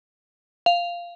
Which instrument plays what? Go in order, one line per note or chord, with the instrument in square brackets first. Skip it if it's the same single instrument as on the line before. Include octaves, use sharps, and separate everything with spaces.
[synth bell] F5